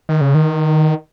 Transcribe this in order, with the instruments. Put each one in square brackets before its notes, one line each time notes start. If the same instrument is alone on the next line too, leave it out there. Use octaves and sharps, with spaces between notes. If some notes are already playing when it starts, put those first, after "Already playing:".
[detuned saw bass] D#3
C#3
D#3